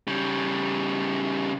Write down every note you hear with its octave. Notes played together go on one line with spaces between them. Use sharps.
C#3 G3